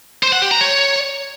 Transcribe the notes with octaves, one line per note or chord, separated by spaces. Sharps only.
C5
F#5
G4
A#5
C#5